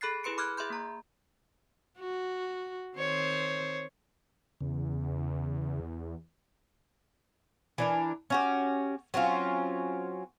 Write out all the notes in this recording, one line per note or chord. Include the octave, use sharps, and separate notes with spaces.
G#4 A4 B5 F#6 A6 C7
E4 G#4 B4 C6 C#7 D7
B5 D6 F6 F#6 G#6
G#4 E5 B5 C6 G6
A#3 A#5
F#4
D#3 C4 C5 C#5
E2 C#3
E3 D4 A#4
C#4 F#4 G4
F#3 C4 C#4 F4